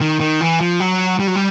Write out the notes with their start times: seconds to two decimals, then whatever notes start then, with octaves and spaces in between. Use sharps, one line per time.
0.01 D#3
0.20 D#3
0.41 E3
0.61 F3
0.80 F#3
1.20 G3
1.27 F#3
1.36 G3